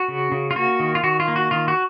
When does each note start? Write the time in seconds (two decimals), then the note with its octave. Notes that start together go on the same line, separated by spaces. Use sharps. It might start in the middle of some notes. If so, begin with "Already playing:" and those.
Already playing: F#4
0.08 C#3
0.32 C#3
0.51 F4
0.56 A#3 F#4
0.80 D#3
0.95 F4
1.03 D#3 F#4
1.20 F4
1.28 A#3
1.36 F#4
1.51 D#3 F4
1.68 F#4